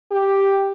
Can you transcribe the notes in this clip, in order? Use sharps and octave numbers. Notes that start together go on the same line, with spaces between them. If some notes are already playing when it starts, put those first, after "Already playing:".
G4